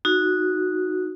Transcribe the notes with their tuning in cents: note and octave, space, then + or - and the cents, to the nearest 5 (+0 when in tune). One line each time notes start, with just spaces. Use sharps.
D#4 +0 F#4 -10